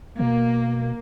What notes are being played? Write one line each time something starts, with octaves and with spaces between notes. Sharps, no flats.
B2 A#3